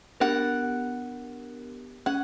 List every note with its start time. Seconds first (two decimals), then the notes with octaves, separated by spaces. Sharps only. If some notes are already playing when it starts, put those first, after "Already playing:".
0.20 B3 D4 G4 A#4 F#5
2.06 C#4 F#5